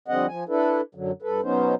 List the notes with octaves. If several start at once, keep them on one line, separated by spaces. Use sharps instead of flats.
F2 D3 G3 C4 D#5 F#5
F3 G#5
D4 E4 A4 B4
F#2 D3 F#3
G2 A4 B4
B2 F#3 B3 C#4 D#4 C5